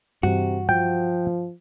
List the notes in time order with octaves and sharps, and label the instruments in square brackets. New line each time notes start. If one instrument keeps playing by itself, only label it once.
[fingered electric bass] G2 E3 [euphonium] C3 [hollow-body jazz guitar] F#4
[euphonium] F3 [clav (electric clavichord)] G5